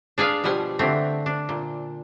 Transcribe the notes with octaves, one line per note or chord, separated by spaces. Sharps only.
D4 G#4 B4 F5
B2 F3 G3 F#5 G#5
D3 E3 A3 C4
D4
A#2